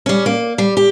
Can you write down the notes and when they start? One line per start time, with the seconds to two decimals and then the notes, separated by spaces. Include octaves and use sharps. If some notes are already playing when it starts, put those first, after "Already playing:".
0.06 G3 C#4
0.26 A#3
0.58 G3
0.77 G4